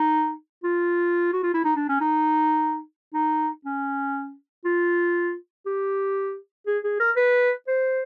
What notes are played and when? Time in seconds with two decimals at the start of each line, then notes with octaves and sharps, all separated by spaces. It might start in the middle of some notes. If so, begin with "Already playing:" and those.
Already playing: D#4
0.64 F4
1.33 F#4
1.43 F4
1.54 E4
1.64 D#4
1.76 D4
1.89 C#4
2.01 D#4
3.14 D#4
3.65 C#4
4.65 F4
5.66 G4
6.67 G#4
6.84 G#4
7.00 A#4
7.16 B4
7.68 C5